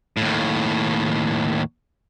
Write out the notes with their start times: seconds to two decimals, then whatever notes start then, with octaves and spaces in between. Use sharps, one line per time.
0.17 D#2 A2